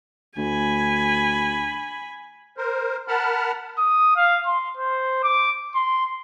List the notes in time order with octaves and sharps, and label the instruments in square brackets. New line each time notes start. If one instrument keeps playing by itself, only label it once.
[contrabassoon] D2 [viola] G#5 B5
[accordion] A#4 C5
A#4 F#5 A5 B5 F6
[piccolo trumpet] D#6
F5
C6
C5
D6
C6